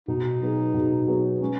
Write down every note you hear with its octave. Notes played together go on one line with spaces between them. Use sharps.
B2 D#4
F#3 B3 G#4
B2
F#3 B3 G#4
G#3 C#4